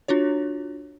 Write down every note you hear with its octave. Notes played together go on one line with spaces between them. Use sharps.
D4 F4 F#4 C#5